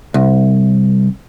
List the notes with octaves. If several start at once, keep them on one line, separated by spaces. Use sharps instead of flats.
C2